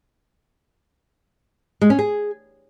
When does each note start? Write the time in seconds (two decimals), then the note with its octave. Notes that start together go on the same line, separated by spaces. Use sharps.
1.81 G#3
1.90 C#4
1.99 G#4